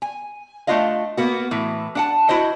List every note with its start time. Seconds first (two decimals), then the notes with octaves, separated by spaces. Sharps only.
0.02 G#5
0.67 A3 B3 D4 F4 D#5 F5
1.17 A#3 B3 F#4
1.51 A2 E3
1.95 D4 F#5 A5
2.29 E4 F#4 C5 D#5